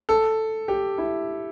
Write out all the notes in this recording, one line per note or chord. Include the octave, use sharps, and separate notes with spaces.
A4
G4
E4